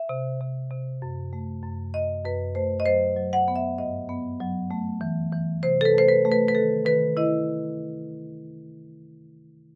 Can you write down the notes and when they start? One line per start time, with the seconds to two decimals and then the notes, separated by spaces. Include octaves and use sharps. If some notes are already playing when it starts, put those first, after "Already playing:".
Already playing: E5
0.09 C3
0.41 C3
0.70 C3
1.02 F#2
1.33 A3
1.63 F#2
1.94 F#2 D#5
2.24 F#2 B4
2.55 A3 C5
2.80 D#5
2.86 F#3 C5
3.17 F#3
3.33 F#5
3.48 B3
3.56 E5
3.78 G2 D#5
4.09 B3
4.41 F#3
4.71 A3
5.01 E3
5.32 E3
5.63 C3 C5
5.81 A4
5.85 B4
5.94 A3 C5
6.08 B4
6.25 A3
6.32 B4
6.48 B4
6.55 D#3 A4
6.85 D#3 B4
7.17 E4 D#5